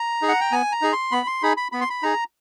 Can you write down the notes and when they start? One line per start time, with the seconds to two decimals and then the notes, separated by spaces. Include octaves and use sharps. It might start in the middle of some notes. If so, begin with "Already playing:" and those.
Already playing: A#5
0.22 D#4 G#4
0.28 F#5
0.40 G5
0.52 B3 G#5
0.72 A#5
0.82 D#4 G#4
0.93 C6
1.11 B3 B5
1.27 C6
1.42 D#4 G#4 B5
1.57 B5
1.72 B3 B5
1.81 C6
1.90 B5
2.03 D#4 G#4 A#5